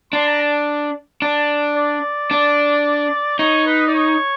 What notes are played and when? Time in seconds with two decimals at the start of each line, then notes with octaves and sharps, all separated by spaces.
0.13 D4 C6
0.27 A#5
0.40 A5
1.22 D4
1.76 D5
2.31 D4
3.39 D#4 C#5
3.66 B4
3.88 D5
3.94 C#5